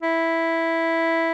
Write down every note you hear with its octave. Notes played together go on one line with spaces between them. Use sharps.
E4